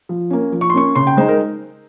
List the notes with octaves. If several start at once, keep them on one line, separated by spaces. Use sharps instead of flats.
F3
A#3 C#4
F3
C#6
C6
A#3 C#4 C#6
C#3 C6
G5
G#3 D#4 C5
A#4